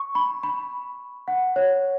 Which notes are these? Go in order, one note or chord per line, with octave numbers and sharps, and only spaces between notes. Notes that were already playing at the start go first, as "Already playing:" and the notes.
Already playing: C#6
B5
B5
F#5
C#5